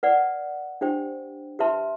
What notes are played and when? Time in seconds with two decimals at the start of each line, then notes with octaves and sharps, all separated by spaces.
0.03 B4 D5 F#5
0.81 D4 G4 C5 G5
1.59 G4 B4 E5 A5 C6